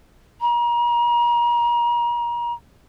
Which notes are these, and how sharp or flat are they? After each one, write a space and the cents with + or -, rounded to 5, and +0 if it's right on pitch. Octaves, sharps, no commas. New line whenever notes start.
A#5 +35